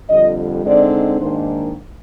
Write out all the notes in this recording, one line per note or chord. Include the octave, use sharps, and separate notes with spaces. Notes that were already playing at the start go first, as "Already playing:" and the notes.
F2 D3 G3 D#5
D3 G#3 C4 D#4 D5
G#2 D#3 A#3 D4 C5